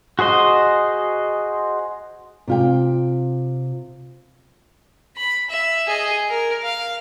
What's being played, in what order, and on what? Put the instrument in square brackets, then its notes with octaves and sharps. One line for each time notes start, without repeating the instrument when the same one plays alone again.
[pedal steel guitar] F#4 G#4 C5 D#5
[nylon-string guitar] C3 F4 G5
[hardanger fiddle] B5
E5
G#4 D#5
A#4
F5